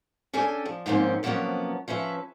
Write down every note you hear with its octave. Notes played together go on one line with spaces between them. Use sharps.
C#4 D4 A4 G5 G#5
F3
G#2 D#3 F3 A#3 C4 C#4
C3 F3 F#3 A#3 B3 C#4
F3 C#4 B4 E5